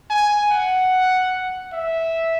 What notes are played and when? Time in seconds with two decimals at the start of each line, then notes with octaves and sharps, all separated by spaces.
0.10 G#5
0.51 F#5
1.74 E5